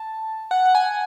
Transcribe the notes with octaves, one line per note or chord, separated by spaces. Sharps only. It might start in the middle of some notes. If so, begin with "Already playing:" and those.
Already playing: A5
F#5
F#5
G#5